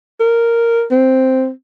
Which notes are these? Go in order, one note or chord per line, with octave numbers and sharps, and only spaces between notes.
A#4
C4